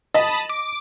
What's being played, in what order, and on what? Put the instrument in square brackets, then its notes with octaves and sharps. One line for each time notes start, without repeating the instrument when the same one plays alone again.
[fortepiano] D#5 [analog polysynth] A5 B5 D#6
[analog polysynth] D6